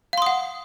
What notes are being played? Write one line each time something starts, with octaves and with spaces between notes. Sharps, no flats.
F5 F#5 C6 D#6